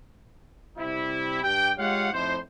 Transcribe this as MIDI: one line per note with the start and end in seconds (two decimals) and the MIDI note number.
0.78 1.43 48
0.78 1.43 55
0.78 1.43 60
0.78 1.43 64
1.43 1.71 43
1.43 1.71 67
1.43 1.71 79
1.78 2.12 56
1.78 2.12 65
1.78 2.12 67
1.78 2.12 73
1.78 2.12 77
1.78 2.12 78
2.13 2.37 41
2.13 2.37 45
2.13 2.37 63
2.13 2.37 64
2.13 2.37 72